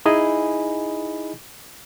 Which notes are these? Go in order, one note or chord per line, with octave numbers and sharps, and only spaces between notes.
D#4 E4 G#4 D#5 G#5 B5